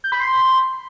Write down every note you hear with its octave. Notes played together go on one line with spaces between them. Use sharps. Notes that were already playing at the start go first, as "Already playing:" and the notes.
G6
B5
C6